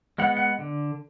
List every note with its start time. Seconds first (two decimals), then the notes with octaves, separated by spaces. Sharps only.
0.18 G#3 B3 F#5
0.37 F#5
0.59 D3